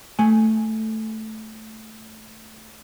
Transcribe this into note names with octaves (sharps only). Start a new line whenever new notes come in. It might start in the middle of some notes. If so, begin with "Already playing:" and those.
A3 G#5